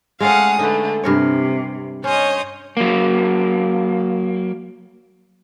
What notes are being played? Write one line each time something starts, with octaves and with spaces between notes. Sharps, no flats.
G#3 A3 C#4 F5 F#5 D#6
D3 A3 D#4 B4
G2 C3 A#4 C#5
C#4 C5 C#5 D#5
F#3 A#3